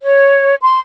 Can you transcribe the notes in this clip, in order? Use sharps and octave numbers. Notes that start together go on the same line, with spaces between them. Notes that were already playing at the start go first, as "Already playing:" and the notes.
C#5
C6